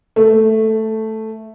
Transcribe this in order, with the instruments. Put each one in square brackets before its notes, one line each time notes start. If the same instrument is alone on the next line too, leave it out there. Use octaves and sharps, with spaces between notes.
[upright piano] A3